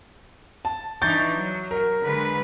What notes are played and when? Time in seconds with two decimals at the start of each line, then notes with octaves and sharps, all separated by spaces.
0.65 A5
1.02 E3 D4 D#4 C#6 G6 A6
1.33 F#3
1.71 A#4
2.01 D3 G#3 B4